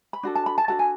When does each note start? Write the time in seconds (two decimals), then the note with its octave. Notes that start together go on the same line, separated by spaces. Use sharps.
0.13 B5
0.23 D4 F#4 A4
0.35 A5
0.46 B5
0.58 A5
0.68 D4 F#4 A4 A5
0.79 G#5